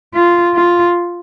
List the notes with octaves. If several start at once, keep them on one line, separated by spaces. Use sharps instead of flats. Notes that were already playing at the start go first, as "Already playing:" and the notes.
F4
F4